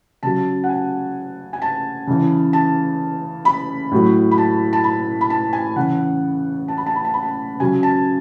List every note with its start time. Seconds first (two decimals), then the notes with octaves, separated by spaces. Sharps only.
0.23 C#3 F#3 A5
0.64 F#5
0.69 G#5
1.53 G#5
1.62 A5
2.07 C#3 E3
2.53 A5
3.45 B5
3.91 A2 F#3
4.31 B5
4.38 A5
4.73 A5
4.84 B5
5.21 B5
5.30 A5
5.53 G#5
5.76 C#3 E3 F#5
6.68 A5
6.77 B5
6.86 A5
6.96 B5
7.05 A5
7.14 B5
7.23 A5
7.60 C#3 F#3 G#5
7.83 A5